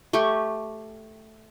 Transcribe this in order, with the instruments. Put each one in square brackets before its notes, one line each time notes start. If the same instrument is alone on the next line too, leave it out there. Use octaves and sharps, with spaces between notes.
[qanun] A3 G4 G5 C#6